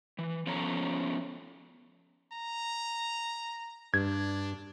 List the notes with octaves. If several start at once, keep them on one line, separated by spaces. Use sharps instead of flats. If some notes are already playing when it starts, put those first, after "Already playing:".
E3
F3 B3 C#4 A4 C#5 A#5
A#5
G2 D4 G#6